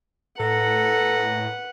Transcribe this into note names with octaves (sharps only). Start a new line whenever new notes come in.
A2 A4 B4 F#5 A#5